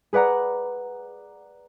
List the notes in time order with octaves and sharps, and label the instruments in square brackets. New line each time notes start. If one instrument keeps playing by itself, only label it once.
[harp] G#4 B4 D5 F#5 A#5